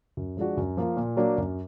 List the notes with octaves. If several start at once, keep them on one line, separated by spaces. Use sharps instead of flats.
F#2
F3 G#3 D4 F#4
F#2
F3 A#3 F4
A#2
F#3 A#3 D4
F#2